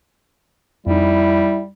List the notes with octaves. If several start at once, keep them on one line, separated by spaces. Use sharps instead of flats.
F2 G3 D#4 E4